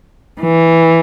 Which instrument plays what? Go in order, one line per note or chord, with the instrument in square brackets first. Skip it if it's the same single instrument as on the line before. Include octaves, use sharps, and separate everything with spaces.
[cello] E3